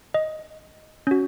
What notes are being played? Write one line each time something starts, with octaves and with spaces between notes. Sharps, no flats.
D#5
C#4 F#4